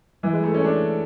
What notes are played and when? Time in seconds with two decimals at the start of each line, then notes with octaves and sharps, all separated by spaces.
0.23 E3
0.33 G#3
0.43 A3
0.54 C#4
0.64 D4